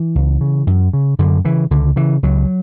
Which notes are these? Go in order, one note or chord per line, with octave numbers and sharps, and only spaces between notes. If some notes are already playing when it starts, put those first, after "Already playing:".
Already playing: E3
C#2
C#3
F#2
C#3
F#2 D3
C#3 E3
C#2 D3
C#3 E3
C#2 F#3